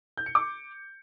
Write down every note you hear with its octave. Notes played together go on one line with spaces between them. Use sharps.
G6
C#7
D6